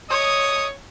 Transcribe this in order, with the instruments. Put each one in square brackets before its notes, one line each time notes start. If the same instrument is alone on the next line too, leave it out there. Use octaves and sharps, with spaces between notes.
[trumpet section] A3 D#5 D#6 [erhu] C#5